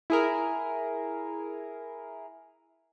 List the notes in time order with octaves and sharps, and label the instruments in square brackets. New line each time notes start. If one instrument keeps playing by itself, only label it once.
[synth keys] E4 G#4 A#4